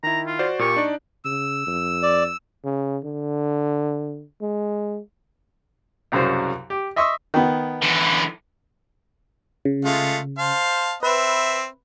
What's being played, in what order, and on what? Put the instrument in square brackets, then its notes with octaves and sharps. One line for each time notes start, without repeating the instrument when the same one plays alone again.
[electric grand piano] D#3 E4 [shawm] A#5
[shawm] F4
[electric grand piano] F#4 C5 D5
[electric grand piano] A#2 A#3 G4 [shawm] C#6
[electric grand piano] D4 D#4 D5
[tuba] C#3 [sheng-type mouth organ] E6
[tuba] F2
[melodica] D5
[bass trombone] C#3
D3
G#3
[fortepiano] C2 F#2 C#3 F#3 C5
G4
D#5 E5 C6 C#6 D#6 E6
D#3 B3
[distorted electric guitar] D3 E3
[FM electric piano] C#3
[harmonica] G#3 A3 F4
C5 F5 A5
[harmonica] C4 E5 [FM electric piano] B4